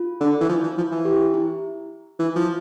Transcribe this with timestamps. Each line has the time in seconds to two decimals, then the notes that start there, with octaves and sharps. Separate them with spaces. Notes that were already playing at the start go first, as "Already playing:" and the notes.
Already playing: F4
0.20 D3
0.40 E3
0.49 F3
0.63 E3
0.77 F3
0.91 E3
1.05 G4
1.34 E4
2.19 E3
2.36 F3